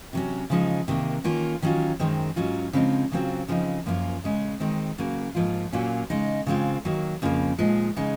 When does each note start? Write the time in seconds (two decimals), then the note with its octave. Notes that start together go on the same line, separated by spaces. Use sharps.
0.13 C3 F#3 C#4
0.50 C#3 F3 G#3 D#4
0.88 C3 D#3 A#3
1.24 D#3 A#3 C#4 F4
1.62 D#3 F#3 C#4 F4
1.99 F#2 D#3 G#3 C4
2.36 G#2 F#3 C#4 F4
2.73 C#3 F3 G#3 C4 D#4
3.12 C#3 F#3 C4 F4
3.48 C#3 F3 C4 D#4
3.86 F#2 F3 A#3 C#4 F4
4.24 C#3 G#3 C#4
4.60 D#3 G#3 C4
4.98 C#3 F#3 A#3
5.35 G#2 F3 A#3 F4
5.72 A#2 F#3 A#3 C#4 F4
6.10 C#3 G#3 D#4
6.46 C#3 G#3 C4 F4
6.85 D#3 F#3 A#3
7.22 F2 C#3 F3 A#3
7.58 A#2 F3 G#3 D#4
7.96 C#3 G#3 D#4